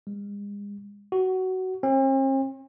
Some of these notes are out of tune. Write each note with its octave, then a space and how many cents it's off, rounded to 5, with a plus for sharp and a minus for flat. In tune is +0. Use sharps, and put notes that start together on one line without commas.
G#3 -40
F#4 +15
C4 +45